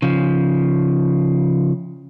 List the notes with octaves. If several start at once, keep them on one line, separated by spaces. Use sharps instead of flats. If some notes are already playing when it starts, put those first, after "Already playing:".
C#3 F3